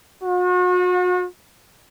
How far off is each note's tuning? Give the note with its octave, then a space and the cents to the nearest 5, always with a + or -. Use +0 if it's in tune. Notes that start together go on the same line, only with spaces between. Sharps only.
F#4 -40